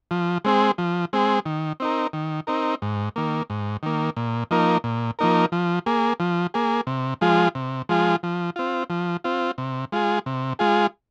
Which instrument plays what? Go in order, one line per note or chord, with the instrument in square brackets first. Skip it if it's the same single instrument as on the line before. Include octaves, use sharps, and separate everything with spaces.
[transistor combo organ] F3
G#3 C4 G#4
F3
G#3 C4 G#4
D#3
C4 D#4 A#4
D#3
C4 D#4 A#4
G#2
D#3 A#3
G#2
D#3 A#3
A#2
F3 A#3 D#4 A#4
A#2
F3 A#3 D#4 A#4
F3
A#3 G#4
F3
A#3 G#4
C3
F3 G#3 F4 G#4
C3
F3 G#3 F4 G#4
F3
C4 F4
F3
C4 F4
C3
G#3 F4 G#4
C3
G#3 F4 G#4